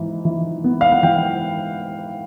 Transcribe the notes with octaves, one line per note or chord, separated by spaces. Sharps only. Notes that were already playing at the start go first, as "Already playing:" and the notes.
Already playing: G#2 E3
E3
B3
F5
F#5
E3 G5